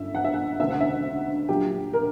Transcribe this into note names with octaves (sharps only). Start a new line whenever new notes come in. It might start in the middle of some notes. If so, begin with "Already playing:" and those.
Already playing: G1 F#2 D3 E5
F#5
E5
F#5
E1 D2 C#3 E5
F#5
E5
A#1 A#2 F#3 G4
A#4